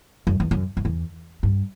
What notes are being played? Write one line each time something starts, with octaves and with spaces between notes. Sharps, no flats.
F#2
E2
F#2
F#2
E2
G2